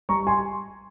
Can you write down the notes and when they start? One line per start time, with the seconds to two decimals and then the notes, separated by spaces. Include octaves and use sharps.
0.09 G3 A#5 C#6
0.27 G#5 C6